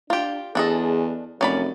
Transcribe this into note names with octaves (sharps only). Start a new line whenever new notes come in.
D4 F4 G4
E2 D4 G#4 A4 D#5
F1 F#2 C#4 D5 B5